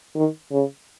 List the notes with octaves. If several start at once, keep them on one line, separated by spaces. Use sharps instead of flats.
D#3
C#3